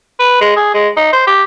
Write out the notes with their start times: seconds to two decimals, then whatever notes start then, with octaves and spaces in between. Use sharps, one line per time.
0.20 B4
0.41 G#3
0.56 G#4
0.74 G#3
0.97 D#4
1.13 C5
1.27 G4